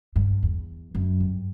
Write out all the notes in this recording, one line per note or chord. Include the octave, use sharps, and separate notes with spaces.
G2
E2
F#2
G2